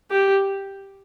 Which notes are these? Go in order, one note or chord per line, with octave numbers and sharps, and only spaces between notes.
G4